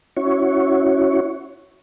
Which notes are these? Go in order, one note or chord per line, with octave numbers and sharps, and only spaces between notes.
C#4 E4 F#4 C#5